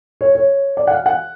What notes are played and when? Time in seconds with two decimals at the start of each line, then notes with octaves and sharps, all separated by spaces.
0.21 C#5
0.35 C#5
0.77 D5
0.87 F#5
0.91 F5
1.06 F#5